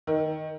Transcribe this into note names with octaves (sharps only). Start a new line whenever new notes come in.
D#3